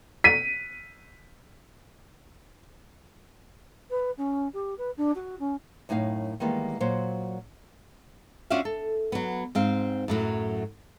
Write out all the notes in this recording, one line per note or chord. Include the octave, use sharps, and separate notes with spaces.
B6 D#7
B4
C#4
G4
B4
D4
F#4
C#4
F#2 A2 D#4 A#4 F5
D#3 E3 G3 G#3 A#3 B3
A#2 F#3 C5
C#4 D4 F4 F#4 E5 F5
A4
F#3 B3
G#2 C4 F5
F#2 A2 F#3